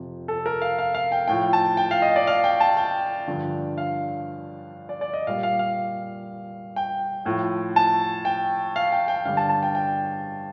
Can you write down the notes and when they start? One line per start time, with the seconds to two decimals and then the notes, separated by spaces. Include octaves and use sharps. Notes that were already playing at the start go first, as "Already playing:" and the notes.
Already playing: F2 C3 F3
0.28 A4
0.46 A#4
0.62 F5
0.79 F5
0.94 F5
1.12 G5
1.28 A2 F3 G5
1.53 A5
1.77 G5
1.91 F5
2.02 D#5
2.16 D5
2.27 F5
2.44 G5
2.60 A5
2.77 G5
3.28 G2 D3 F3
3.78 F5
4.89 D5
5.01 D5
5.13 D#5
5.27 A#2 G3 F5
5.43 F5
5.59 F5
6.76 G5
7.25 A2 F3
7.76 A5
8.25 G5
8.76 F5
8.92 G5
9.08 G5
9.25 G2 D3 G3 F5
9.37 A5
9.49 A5
9.63 G5
9.75 G5